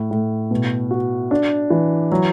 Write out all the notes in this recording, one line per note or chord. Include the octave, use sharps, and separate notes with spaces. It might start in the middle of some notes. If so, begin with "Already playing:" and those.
Already playing: A2
A2
B2
F#4
D4
E3
F#3